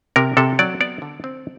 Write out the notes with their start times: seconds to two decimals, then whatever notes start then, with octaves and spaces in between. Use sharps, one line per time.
0.16 C3 A#4
0.37 C3 A4
0.59 F#3 D5
0.80 B3 D5
1.02 D3
1.24 C4